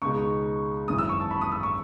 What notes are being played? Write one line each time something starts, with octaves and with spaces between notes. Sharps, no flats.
C#2 B2 G#3 D#4 C#6
G#1 F#2 E3 D#6
E6
C#6
A5
B5
D#6
E6
C#6